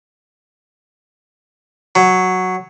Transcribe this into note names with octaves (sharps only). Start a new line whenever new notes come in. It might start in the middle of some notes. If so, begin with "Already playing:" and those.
F#3